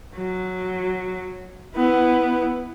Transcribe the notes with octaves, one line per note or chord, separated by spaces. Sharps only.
F#3
B3 E4